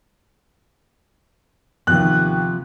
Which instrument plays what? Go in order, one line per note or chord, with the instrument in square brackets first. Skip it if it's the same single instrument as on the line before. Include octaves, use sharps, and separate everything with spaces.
[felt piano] D#2 F#6 [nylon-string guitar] C3 F3 B3